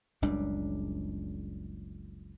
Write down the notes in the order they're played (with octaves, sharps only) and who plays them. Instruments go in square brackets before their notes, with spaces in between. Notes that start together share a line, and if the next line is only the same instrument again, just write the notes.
[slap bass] F#1 C#2 G3 D4